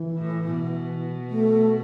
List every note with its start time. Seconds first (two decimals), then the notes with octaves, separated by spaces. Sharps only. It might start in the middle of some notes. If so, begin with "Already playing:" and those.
Already playing: E3
0.18 A2
0.46 B2
1.30 A3